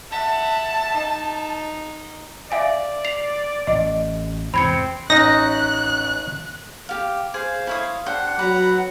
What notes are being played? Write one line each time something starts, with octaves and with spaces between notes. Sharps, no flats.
E5 F#5 A5
D#4
D5 E5 F5 G#5
C7 F7
A1 D#5
E2 G#2 C3 C4 B5 G#6 C#7
A1 C#4 D#4 F#6 A#6
G4 F5
G#4 C5 F5
E4 C#5 D#6
D4 G4 C5 F#5
F#3 B4 A#5 B5